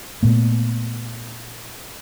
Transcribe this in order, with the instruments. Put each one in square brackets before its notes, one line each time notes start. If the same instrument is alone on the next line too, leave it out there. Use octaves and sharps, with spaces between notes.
[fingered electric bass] A#2 A3 B3